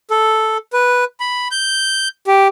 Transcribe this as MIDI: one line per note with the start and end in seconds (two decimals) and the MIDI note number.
0.11 0.58 69
0.73 1.04 71
1.20 1.48 83
1.51 2.08 91
2.27 2.48 67